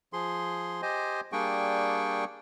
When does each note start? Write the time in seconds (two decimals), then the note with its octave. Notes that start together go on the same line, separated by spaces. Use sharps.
0.13 F3 G#4 C6
0.82 G4 C5 D#5 G#5
1.32 G3 A#3 D4 G#4 G5 C#6